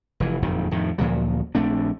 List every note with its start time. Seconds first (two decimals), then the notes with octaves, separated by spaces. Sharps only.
0.20 F1 E3
0.42 F#1 F2 A#2 D#3
0.71 F2 A2 D#3
0.98 D2 A#2 F3 F#3
1.55 A#1 A3 C4 D4